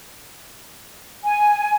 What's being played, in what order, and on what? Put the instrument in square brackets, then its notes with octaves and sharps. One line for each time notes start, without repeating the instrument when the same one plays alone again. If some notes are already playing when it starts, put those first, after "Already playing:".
[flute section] G#5